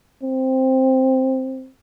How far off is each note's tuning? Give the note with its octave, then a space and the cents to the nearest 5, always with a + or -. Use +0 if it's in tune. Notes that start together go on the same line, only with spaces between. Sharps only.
C4 +5